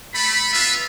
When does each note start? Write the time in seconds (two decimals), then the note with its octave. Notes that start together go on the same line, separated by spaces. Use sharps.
0.14 A3 B5
0.53 B3 F4 B4 E5